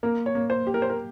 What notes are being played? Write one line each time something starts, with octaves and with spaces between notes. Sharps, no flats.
A#3 A#4
C#5
A#3
C5
G4
A#4
C5
A#4